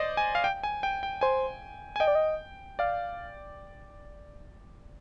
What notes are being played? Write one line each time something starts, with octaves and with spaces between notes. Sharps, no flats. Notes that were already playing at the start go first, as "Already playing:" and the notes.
Already playing: C5 D5 D#5
G#5
F5
G5
G#5
G5
G5
C5 G#5
G#5
D#5 G5
D5
D#5
D5 F5